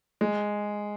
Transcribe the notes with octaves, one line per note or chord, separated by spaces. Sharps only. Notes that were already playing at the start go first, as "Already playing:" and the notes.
G#3